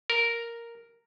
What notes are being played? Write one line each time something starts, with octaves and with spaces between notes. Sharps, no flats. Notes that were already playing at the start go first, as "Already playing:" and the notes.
A#4